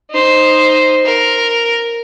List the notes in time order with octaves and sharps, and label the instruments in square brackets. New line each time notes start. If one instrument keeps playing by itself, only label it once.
[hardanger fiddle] D#4 C5
A#4